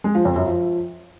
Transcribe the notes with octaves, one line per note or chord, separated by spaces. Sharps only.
G#3
F3
F2
F#2
F3